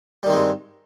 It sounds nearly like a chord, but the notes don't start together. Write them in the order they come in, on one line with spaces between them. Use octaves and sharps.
G3 D#3 C4 G#3 G2